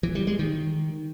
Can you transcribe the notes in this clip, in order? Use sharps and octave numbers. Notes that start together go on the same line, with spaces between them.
E3
G3
G#3
D#3